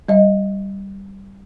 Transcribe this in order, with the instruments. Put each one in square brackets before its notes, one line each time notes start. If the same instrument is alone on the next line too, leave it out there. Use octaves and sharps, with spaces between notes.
[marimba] G3 D#5